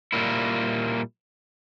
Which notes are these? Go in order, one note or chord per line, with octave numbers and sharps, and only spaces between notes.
A#2 G3 A#3 E4